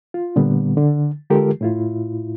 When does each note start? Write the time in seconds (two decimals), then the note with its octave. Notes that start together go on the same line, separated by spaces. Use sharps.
0.14 F4
0.36 A#2 D3 G3 B3
0.77 D3
1.30 D3 G#3 F4 G4 A4 A#4
1.61 A2 E4 F4